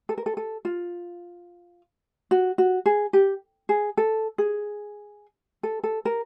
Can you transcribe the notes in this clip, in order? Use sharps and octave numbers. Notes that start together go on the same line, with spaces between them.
A4
A#4
A4
A4
F4
F#4
F#4
G#4
G4
G#4
A4
G#4
A4
A4
A#4